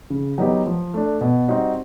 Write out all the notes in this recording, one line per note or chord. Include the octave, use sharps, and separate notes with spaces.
C#3
F#3 B3 D#4 G4
F3
A3 D4
B2
G3 C4 D#4 F#4